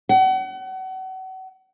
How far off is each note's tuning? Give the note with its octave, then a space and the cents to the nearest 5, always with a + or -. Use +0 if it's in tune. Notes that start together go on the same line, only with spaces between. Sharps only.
F#5 +35